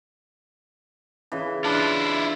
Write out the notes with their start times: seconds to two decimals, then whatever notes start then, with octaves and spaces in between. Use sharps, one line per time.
1.32 C#3 E3
1.64 D4 E4 F4